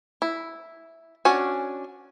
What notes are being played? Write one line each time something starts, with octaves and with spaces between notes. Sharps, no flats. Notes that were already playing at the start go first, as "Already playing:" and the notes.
E4
C#4 D4 F#4 G#5